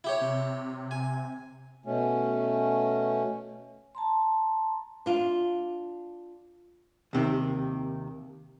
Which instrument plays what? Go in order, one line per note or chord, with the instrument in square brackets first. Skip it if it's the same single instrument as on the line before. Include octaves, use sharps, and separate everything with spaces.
[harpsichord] E4 G4 C#5
[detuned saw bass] C3
[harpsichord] G#5
[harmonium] B2 A3 C#4
[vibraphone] A5 A#5 C6
[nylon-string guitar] D4 F4
[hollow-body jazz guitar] D#2 C3 D#3